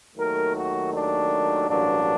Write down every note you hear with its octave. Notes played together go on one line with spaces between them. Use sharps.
D#2 D#3 F#3 A3 A#4
F#4
D4
A1 G2 F#3 A#3 D4